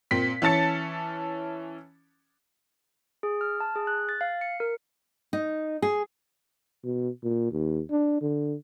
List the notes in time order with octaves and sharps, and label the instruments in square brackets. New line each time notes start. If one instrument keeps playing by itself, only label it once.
[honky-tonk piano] A#2 C4 B6
E3 C#4 A5 A6 C#7
[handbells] G#4
F6
A5
G#4
F#6
A6
F5
C#7
A#4
[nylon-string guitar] D#4
G#4
[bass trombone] B2
A#2
D#2
D4
D3